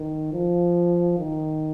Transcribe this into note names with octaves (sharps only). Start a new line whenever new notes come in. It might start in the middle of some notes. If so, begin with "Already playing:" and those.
Already playing: D#3
F3
D#3